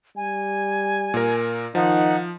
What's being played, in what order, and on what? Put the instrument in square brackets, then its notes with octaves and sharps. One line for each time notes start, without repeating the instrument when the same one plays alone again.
[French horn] G3 [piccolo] G#5
[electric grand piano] A#2 A#4
[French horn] D#3 [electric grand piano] F3 [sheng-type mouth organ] D#4 [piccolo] F#5